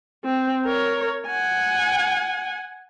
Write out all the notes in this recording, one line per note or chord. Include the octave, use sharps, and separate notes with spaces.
C4
A#4 C#5
F#5 G#5